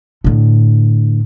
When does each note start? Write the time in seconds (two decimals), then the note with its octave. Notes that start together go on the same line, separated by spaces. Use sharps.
0.24 A2 D3